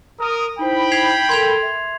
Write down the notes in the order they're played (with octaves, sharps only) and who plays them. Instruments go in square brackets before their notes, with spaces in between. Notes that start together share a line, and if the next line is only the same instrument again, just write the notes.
[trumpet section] A#4 D#6
[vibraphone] D#4 E4 C5 [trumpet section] G5 B5
[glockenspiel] G#6 C7 F7
[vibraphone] A4 A#4 [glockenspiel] C6 G#6 F7
[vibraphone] E5